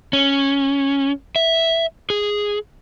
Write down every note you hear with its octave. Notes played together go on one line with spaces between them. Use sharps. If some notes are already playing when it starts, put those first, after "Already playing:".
C#4
E5
G#4